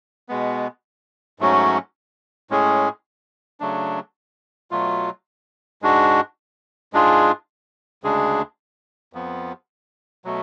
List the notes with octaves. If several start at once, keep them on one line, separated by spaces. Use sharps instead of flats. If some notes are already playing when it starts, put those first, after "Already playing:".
B2 G#3 B3
G#2 F#3 A3 C#4 F#4
A2 G#3 C#4 G#4
C#3 F#3 A3 D4
B2 F#3 A3 F4
G#2 G#3 D4 F#4
G#2 G#3 D4 F4 G#4
D2 C#3 G#3 D4 G#4
F2 F3 B3
B2 F#3 A3